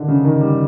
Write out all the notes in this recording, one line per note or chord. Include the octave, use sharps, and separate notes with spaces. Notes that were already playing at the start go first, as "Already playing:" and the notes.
Already playing: D3 D#3
C#3
D#3
G3